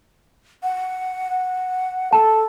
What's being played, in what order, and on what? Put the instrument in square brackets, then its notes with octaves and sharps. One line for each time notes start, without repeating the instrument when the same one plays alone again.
[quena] F#5
[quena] A4 [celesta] A5